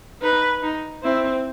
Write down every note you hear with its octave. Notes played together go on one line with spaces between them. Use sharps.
D#4 B4
D#4
C4 E4